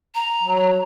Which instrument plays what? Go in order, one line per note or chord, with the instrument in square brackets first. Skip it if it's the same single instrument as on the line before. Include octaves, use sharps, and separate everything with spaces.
[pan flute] A#5
[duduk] F#3